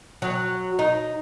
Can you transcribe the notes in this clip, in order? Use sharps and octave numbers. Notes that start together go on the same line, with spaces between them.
F#3
D#4